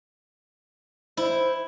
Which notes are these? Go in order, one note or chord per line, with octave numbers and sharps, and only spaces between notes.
E4 C5